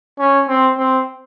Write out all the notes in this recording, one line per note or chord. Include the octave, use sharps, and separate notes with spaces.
C#4
C4
C4